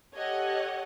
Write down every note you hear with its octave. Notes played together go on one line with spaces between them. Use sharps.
G4 A4 C#5 D#5 F#5